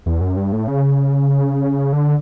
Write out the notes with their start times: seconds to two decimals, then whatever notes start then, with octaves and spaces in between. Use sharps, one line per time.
0.06 E2
0.21 F#2
0.37 G2
0.53 A2
0.68 C#3
1.93 D3